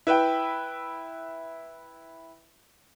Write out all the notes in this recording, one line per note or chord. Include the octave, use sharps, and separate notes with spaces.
E4 B4 E5 G5